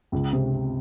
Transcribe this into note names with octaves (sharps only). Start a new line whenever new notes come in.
C#2
C3